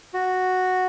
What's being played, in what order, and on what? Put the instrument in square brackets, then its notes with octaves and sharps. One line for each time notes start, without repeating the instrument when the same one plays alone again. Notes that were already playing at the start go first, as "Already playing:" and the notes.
[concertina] F#4